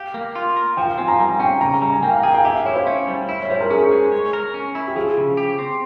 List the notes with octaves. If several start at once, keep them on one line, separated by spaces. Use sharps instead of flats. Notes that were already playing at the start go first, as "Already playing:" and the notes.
Already playing: G4 F5
A#3
F4
A#4
F3 G5
F5
C4 G#5
A#5
G3 G#5
C#4 G5
C#3 A#5
G3 A#5
G#5
A#3 G5
F5
G#4 G5
G5
G4 E5
F5
E4 C#5
C5
C#4
G3
E4
C#5
G3 C5
A#4
C#4 G#4
G#3
C#5
A#4
C#4
E4
G4
F3 G#4
C#3
G4
C4